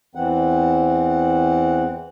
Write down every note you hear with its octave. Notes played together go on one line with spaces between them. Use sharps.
E2 E3 C4 F#5